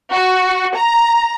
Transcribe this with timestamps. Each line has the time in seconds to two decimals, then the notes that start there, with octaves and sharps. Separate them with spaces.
0.12 F#4
0.77 A#5